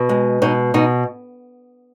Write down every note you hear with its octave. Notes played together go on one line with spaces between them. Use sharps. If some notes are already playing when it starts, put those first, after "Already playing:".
Already playing: B2
G#3
B2 D#4
B2 D#4